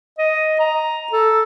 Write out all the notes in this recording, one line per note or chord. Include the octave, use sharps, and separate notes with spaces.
D#5
A#5
A4